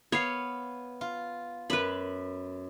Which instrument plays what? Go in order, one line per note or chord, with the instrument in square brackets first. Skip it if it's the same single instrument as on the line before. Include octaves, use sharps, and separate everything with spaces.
[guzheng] B3 [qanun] C#5 F5
[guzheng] F4
[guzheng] F#2 [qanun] B4 B5